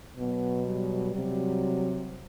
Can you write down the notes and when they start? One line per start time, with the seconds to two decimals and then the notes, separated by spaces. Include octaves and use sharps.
0.17 B2 F#3 B3
0.65 G3
1.13 C3 F#3